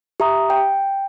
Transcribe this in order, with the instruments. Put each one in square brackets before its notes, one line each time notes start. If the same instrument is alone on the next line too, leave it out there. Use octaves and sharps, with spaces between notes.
[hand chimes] G4 E5 A#5 D#6
G5